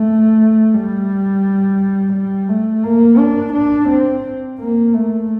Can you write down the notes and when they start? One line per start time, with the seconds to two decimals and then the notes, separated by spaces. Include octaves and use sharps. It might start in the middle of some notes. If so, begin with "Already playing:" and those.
Already playing: A3
0.74 G3
2.13 G3
2.48 A3
2.83 A#3
3.18 D4
3.53 D4
3.89 C4
4.59 A#3
4.93 A3